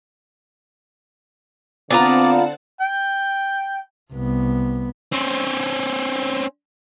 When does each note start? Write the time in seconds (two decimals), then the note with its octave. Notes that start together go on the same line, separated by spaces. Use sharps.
1.91 D3 B3 C4 F4 D5 F#5 A5 A#5
2.81 G5
4.13 C2 B3
5.13 C4 C#4